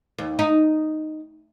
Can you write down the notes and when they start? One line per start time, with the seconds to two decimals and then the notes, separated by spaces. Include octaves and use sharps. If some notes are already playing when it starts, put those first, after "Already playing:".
0.18 D#2
0.39 D#4